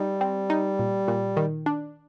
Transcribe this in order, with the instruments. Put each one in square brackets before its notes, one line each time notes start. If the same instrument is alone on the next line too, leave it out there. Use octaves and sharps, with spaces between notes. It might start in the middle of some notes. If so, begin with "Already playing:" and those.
Already playing: [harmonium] G3 [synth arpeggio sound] D#4
[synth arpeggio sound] C4
D#4
A#2
A#2
D#3
D4